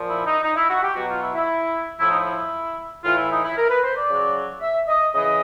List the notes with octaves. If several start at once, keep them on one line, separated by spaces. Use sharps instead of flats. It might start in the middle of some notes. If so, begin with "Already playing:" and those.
Already playing: A#2 F3
E4
D#4
D#4
E4
F#4
G4
B2 F#3 F#4
F4
E4
E4
A2 F3 E4
D#4
E4
A2 E3 F4
E4
D#4
E4
A#4
B4
C5
D5
C#3 F#3
E5
D#5
C#3 E3 D#5